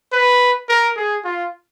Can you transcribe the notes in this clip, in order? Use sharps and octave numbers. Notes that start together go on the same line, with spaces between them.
B4
A#4
G#4
F4